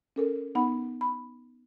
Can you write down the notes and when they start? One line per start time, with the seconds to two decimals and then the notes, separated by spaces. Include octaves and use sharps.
0.16 C#4 A4 A#4
0.55 B3 D#4 F#5 B5
1.01 B5